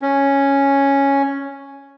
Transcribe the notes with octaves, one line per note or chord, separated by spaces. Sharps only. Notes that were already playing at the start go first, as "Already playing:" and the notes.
C#4